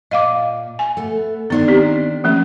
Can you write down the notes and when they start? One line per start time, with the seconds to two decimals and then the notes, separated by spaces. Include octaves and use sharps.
0.11 A#2 D#5 F5 D6
0.79 G#5
0.97 A3 B3
1.50 D#3 B3 D4 D#4 C5
1.68 C4 G4
2.24 F3 A3 C#4